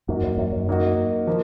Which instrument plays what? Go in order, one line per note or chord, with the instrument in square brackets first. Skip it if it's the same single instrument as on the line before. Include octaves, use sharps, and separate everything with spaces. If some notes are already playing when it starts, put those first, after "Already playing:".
[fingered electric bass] F#2 [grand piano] F#3 A#3 D#4 F#4
[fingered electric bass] F#2
F#2
F#2
[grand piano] F#3 A#3 D#4 F#4
F3 A#3